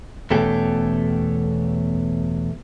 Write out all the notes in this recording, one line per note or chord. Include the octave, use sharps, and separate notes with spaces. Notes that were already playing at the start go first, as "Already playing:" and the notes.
E2 B2 A3 C#4 G4 A4